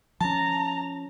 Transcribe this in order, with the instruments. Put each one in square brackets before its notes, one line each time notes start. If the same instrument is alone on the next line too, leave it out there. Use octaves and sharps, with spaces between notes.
[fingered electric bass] F3 C#4 [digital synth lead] A5 [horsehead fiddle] A#5